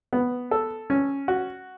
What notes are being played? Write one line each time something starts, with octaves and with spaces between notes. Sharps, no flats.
B3
A4
C#4
F#4